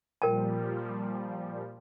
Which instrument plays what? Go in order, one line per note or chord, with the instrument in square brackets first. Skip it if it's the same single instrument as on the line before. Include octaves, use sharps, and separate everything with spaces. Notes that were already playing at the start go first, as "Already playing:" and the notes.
[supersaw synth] A#2 F3 G3 [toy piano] A#4 G5 A5